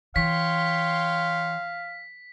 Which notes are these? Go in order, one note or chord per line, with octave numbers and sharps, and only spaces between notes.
E3 C#5 F5 G5 C6 B6